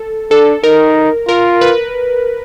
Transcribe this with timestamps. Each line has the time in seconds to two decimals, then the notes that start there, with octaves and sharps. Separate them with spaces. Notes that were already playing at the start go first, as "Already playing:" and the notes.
Already playing: A4
0.31 D4 A4
0.64 D#4 A#4
1.28 F4 A#4
1.61 B4